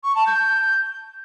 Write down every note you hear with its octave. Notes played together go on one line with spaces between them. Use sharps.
C#6
A5
G6